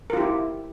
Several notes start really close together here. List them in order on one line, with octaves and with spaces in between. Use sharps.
A#4 F4 G4 E4